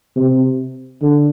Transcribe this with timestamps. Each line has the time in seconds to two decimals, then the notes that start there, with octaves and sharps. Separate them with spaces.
0.16 C3
1.02 D3